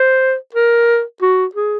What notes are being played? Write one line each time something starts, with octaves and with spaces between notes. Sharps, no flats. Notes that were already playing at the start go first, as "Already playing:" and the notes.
Already playing: C5
A#4
F#4
G#4